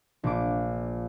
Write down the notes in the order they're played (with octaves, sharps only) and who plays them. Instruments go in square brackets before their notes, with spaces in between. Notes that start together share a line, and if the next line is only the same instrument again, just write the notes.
[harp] A#1 D6